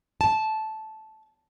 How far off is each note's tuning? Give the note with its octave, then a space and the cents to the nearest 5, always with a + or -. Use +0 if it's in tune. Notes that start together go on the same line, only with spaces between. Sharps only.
A5 -10